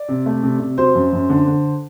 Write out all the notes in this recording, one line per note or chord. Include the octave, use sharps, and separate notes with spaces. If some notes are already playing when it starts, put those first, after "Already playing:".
Already playing: D5
C3
A3
C3
C3
F#3 C5
F#2
F#2
D3
D3